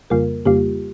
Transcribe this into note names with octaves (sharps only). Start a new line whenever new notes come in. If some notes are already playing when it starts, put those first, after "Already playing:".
F2 C#3 G3 A#3 F4 A#4
F2 C#3 G3 A#3 F4 G4